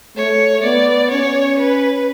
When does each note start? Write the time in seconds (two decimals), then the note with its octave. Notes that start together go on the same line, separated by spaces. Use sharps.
0.17 A3 C#5
0.64 B3 D5
1.11 C#4 C#5
1.59 B4